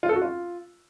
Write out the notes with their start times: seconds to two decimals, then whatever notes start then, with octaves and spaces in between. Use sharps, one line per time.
0.03 F4
0.09 A4
0.15 F#4
0.22 F4